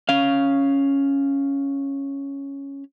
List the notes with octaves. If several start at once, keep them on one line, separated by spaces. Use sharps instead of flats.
C#4 F5